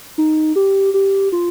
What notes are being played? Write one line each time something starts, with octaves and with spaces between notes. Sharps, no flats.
D#4
G4
G4
F4